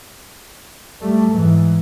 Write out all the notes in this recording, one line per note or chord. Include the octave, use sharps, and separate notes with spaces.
G3 A3
G#2 E3